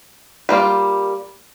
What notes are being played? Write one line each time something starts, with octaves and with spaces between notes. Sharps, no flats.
G3 A#3 F4